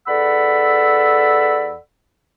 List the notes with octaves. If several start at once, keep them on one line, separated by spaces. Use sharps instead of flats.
E2 A4 D5 F#5 B5 E6